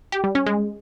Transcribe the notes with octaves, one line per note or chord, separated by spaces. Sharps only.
G4
G3
C#4
G#3